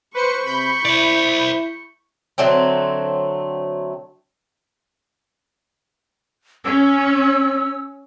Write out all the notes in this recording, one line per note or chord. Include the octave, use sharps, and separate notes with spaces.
B4 C5 C#6 C#7
C3 B5 G6
E4 C5 D5
D3 F#3 A3 C4
C#4 E6